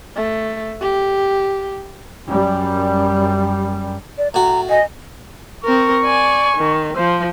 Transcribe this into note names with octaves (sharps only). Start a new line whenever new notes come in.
A3
G4
F#2 G3
D5
A2 F#4 A#5
D#5 G#5
C4 A#4 C#6
D5 G#5
D#3
F3 C5